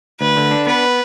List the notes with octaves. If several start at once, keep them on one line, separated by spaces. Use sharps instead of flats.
D2 B4
D3
D4
B3 B4